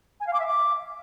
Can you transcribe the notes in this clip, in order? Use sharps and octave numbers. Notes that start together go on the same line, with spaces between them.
G#5
F5
D6
E5
D6